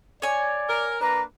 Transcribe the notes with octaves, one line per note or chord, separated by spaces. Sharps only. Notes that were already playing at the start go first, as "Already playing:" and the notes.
C#5 D5 G#5
A#4
A#3 D4 B4 A#5